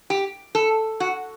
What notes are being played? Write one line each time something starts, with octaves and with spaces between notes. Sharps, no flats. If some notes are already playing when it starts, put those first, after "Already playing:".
G4
A4
F#4